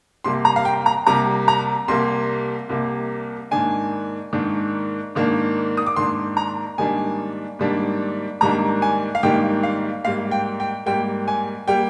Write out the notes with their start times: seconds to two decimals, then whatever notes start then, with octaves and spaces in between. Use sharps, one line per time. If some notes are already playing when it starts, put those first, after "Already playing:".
0.24 C2 C3 G3 A#3 C6
0.45 A#5
0.56 F5
0.65 G5
0.86 A#5
1.07 C2 C3 G3 A#3 A#5
1.48 A#5
1.88 C2 C3 G3 A#3 C6
2.69 C2 C3 G3 A#3
3.51 G#2 D#3 A#3 D4 G#5
4.33 G#2 D#3 A#3 D4
5.15 G#2 D#3 A#3 D4
5.77 D#6
5.86 D6
5.96 G#2 D#3 A#3 D4 C6
6.37 A#5
6.78 G#2 D#3 G3 A#3 D4 G#5
7.59 G#2 D#3 G3 A#3 D4
8.41 G#2 D#3 G3 A#3 D4 A#5
8.82 G#5
9.15 F5
9.23 G#2 D#3 G3 A#3 D4 G5
9.63 F5
10.05 G#2 G3 A#3 F5
10.31 G5
10.60 G5
10.86 G#2 G3 A#3 G5
11.28 G#5
11.68 G3 A#3 G5